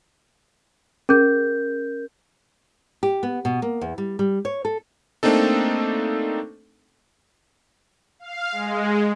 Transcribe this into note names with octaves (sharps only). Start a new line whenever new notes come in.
C#4 G#4 A#4 G6
G4
B3
B2
A#3
E2
G3
G3
C#5
A4
A3 A#3 C4 D4 D#4 A4
F5
G#3